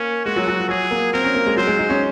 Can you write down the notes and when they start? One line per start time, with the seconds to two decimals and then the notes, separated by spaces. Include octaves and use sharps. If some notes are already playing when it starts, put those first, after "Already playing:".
Already playing: A#3 C#4
0.25 G#3 F#4
0.36 F#3
0.47 F#3
0.59 F3
0.69 F#3 G#4
0.91 A#3
1.13 C4 A#4
1.24 C#4
1.35 A#3
1.46 G#3
1.56 F#3 C5
1.67 G#3
1.79 D#4
1.90 C#4